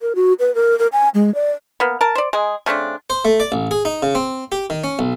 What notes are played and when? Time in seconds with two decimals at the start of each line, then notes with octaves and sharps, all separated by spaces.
0.01 A#4
0.15 F#4
0.39 B4
0.55 A#4
0.79 A#4
0.93 G#5
1.15 G#3
1.35 D5
1.80 A#3 B3
2.01 A#4 A5
2.15 C5 D5
2.33 G#3 G#4
2.66 C#3 A3 C4 D4
3.10 C5
3.25 A3
3.40 D5
3.52 A1
3.71 G#4
3.85 D#4
4.03 C#3
4.15 C4
4.52 G4
4.70 D#3
4.84 C#4
4.99 B1